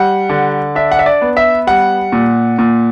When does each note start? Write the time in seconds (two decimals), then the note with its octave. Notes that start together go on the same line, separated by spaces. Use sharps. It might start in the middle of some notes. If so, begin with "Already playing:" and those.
Already playing: G3 F#5
0.29 D3
0.75 D4 E5
0.92 F#5
0.99 E5
1.06 D5
1.22 B3
1.37 E5
1.67 G3 F#5
2.12 A#2
2.59 A#2